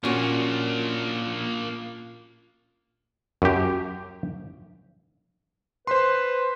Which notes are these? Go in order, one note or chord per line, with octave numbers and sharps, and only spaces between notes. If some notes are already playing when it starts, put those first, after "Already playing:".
A#2 A#3 C#4 D4 F#4
F#2 G4
B4 C5 C6